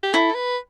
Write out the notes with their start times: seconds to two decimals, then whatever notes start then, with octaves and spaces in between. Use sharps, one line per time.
0.03 G4
0.13 E4 A4
0.35 B4